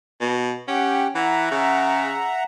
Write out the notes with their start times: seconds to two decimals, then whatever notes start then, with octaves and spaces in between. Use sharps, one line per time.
0.21 B2
0.68 C#4 G4 F#5 G5
1.15 E3 E5 F#5 A#5
1.51 C#3